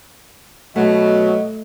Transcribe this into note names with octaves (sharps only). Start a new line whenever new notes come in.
B2 F#3 A3 D#5